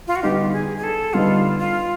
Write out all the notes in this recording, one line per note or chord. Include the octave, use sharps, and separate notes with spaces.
F4
F#4
D3 G3 B3 D#4 G4
G#4
G#4
A4
D3 G3 B3 D#4 F4
F4